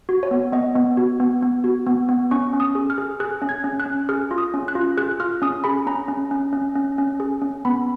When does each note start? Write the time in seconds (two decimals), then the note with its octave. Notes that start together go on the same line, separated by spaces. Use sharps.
0.09 F#4
0.23 C#5
0.31 B3
0.53 B3 D#5
0.76 B3
0.97 F#4
1.20 B3
1.43 B3
1.64 F#4
1.87 B3
2.09 B3
2.31 C#4 C#6
2.53 C#4
2.60 D#6
2.75 G#4
2.90 F6
2.98 G#4
3.20 G#4 F#6
3.42 C#4
3.49 G#6
3.64 C#4
3.80 F#6
3.86 C#4
4.09 G#4 F6
4.31 F4
4.38 D#6
4.54 C#4
4.68 F#6
4.75 F4
4.97 G#4 F#6
5.20 F4 F6
5.42 C#4 D#6
5.64 G#4 B5
5.87 C#4 A#5
6.09 C#4
6.31 C#4
6.53 C#4
6.76 C#4
6.98 C#4
7.20 G#4
7.42 C#4
7.65 B3 B5